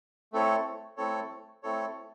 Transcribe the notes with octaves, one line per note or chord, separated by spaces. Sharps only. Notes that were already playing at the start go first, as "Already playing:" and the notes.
A3 C4 E4 A4 C#5
A3 C4 E4 A4 C#5
A3 C4 E4 A4 C#5